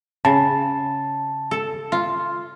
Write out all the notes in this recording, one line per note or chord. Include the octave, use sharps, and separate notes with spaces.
C#3 A5
A4
F4